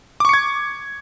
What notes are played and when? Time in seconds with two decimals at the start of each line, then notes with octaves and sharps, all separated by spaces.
0.20 D6
0.25 C#6
0.29 C#7
0.33 G#6